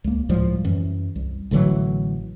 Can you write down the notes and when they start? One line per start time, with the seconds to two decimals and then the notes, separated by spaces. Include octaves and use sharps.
0.04 C#2 A#3
0.29 C#2 A2 F3 G3
0.64 F#2 E3
1.16 C2
1.51 A1 D3 E3 F#3